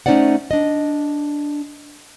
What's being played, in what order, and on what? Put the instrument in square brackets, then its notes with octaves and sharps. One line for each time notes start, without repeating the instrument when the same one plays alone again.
[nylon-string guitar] A3 C#4 D#4 C5 D5 F#5
D4 D#5